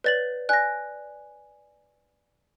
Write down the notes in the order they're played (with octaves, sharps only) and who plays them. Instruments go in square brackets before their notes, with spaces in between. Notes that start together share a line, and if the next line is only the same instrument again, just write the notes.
[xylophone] B4 A6 F#7 [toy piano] C#5 D5 F#5
[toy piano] D5 G#5 [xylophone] F#6 A#6